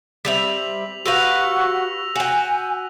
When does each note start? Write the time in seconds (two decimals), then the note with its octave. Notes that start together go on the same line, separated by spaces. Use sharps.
0.25 G3 C4 E5 B6 F7 F#7
1.06 F#4 G4 B4 F5 E6 A#6 F7
2.16 F#4 G5 G#5